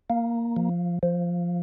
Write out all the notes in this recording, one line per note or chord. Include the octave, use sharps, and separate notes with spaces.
A#3
F3
F3